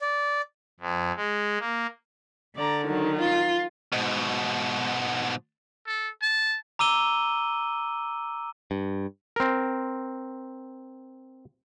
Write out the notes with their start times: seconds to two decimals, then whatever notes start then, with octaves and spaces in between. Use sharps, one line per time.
0.01 D5
0.80 F2
1.16 G#3
1.59 A#3
2.56 D3 D5 A#5
2.84 D#3 F#3
3.19 F4
3.93 G#2 B2
5.87 A4
6.22 A5
6.79 A#5 D6 E6 D#7 G7
8.71 G2
9.36 C4 A#4